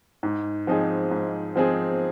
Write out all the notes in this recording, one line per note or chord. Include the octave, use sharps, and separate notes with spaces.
G#2
F3 C4 D#4 G#4
G#2
F3 C4 D#4 G#4